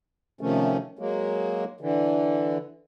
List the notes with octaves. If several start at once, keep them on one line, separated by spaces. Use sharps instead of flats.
C3 D#3 F3 A3 C#4
F#3 G#3 A#3
D3 E3